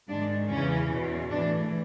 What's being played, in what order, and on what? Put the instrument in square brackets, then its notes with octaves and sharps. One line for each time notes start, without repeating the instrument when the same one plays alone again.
[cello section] G#2 D#3 D4
E2 C#3 E3 C#4
E2 B2
A2 E3 D4